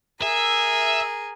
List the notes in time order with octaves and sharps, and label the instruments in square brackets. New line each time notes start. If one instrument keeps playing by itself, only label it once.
[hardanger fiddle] G#4 A#4 [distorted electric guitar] E5